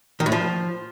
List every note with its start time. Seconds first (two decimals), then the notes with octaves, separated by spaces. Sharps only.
0.20 D#3
0.26 A2
0.32 F3